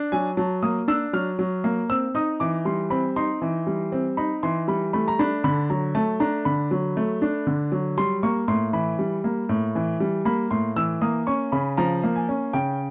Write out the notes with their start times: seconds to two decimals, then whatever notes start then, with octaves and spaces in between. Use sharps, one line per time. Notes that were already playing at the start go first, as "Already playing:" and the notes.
Already playing: D4
0.12 F#3 G#5
0.37 F#3 A5
0.62 A#3 D#6
0.88 D4 E6
1.13 F#3 F6
1.39 F#3
1.64 A#3
1.90 C4 E6
2.15 D#4 D#6
2.40 E3 D6
2.65 G3 C6
2.90 C4 B5
3.16 D#4 C6
3.42 E3
3.67 G3
3.92 C4
4.17 D#4 B5
4.43 E3 C6
4.68 G3 B5
4.93 A3 B5
5.08 A#5
5.19 D4 B5
5.44 D3 B5
5.70 F#3 A#5
5.95 A3 A5
6.20 D4 A#5
6.45 D3 B5
6.71 F#3
6.97 A3
7.22 D4
7.47 D3
7.72 F#3
7.98 G3 C6
8.23 A#3 C#6
8.48 A2 C6
8.73 E3 B5
8.99 G3
9.24 A#3
9.49 A2
9.75 E3
10.00 G3
10.25 A#3 B5
10.51 A2 C6
10.76 E3 E6
11.02 A#3 D#6
11.27 C#4 C#6
11.52 C#3 B5
11.77 F3 A#5
12.04 A#3
12.16 G#5
12.29 C#4
12.53 C#3 G5